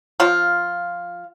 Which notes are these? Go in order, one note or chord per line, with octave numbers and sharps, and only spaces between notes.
F3 F4